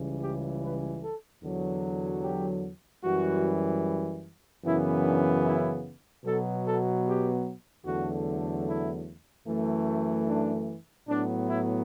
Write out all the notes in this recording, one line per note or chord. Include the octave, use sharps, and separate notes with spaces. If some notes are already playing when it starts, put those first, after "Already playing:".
Already playing: C#2 C#3 E3 G3
G4
B4
A4
E2 D3 F#3
G4
F#2 E3 G3 F#4
F#2 C#3 E3 B3 E4
D4
E4
B2 F#3 B3 A4
A4
G4
E2 D3 F#3 A3 F#4
E4
F#2 E3 A3
D4
A2 F#3 B3 D4
E4